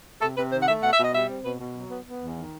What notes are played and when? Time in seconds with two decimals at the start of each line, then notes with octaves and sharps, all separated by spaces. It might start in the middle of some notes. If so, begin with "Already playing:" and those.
0.22 C3 A4
0.37 C3 B4
0.52 D#3 C5
0.63 F#5
0.68 A3 E5
0.83 B2 F#5
0.93 E5
0.99 B2
1.05 D#5
1.14 G3 E5
1.30 C4
1.45 B2 B4
1.60 B2
1.76 F#3
1.91 B3
2.06 B3
2.22 E2
2.38 D#3